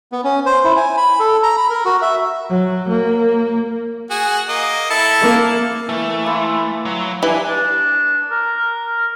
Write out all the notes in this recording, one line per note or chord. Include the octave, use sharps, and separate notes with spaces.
B3
C#4
C5
E4
G#5
B5
A4
A#5
B5
A#4
F#4
E5
F#3
A#3
F#4 G#4
A#3 D#5
E4 A4 A5
A#3
E3 A3
A#3 E4 C6
F#3
G2 E3 D4 B4 G#5
D4
A#4